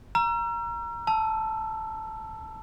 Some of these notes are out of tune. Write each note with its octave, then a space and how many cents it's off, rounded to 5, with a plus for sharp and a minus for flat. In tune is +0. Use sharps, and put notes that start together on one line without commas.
A#5 +15 E6 +45
A5 +0 E6 +5